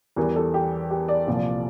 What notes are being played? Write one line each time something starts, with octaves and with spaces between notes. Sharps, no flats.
E2 E3 G3 A#4
A4
G4
G4
D5
C2 A#2 F3